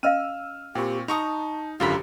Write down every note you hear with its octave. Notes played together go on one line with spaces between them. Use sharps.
C#4 D#5 F5 E6 F6 D#7
A#2 C4 F#4 G4 G5 C#6
D#4 A5 A#5 C#6 D#6
G#1 F#2 D3 F4 G4 A#5 B5